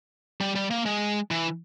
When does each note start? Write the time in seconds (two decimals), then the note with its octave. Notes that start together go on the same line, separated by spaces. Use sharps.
0.41 G3
0.56 G3
0.71 A#3
0.86 G#3
1.31 E3